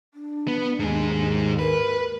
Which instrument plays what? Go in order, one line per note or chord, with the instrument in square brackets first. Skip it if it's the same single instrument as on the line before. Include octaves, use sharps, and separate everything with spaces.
[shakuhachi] D4
[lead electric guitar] B3
[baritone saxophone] D#2 [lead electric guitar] G#2 G#4
[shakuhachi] A#4 [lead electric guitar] B4